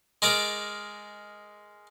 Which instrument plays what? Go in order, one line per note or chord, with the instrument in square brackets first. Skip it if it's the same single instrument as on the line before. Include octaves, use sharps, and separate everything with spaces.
[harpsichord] G#3 A#4 D5 D6